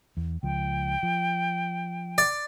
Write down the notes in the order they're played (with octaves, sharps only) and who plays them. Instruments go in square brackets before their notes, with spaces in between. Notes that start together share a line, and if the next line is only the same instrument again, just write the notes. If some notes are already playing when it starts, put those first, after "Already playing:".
[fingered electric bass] E2
[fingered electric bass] C#2 F3 [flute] G5
[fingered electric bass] F3
[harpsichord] D5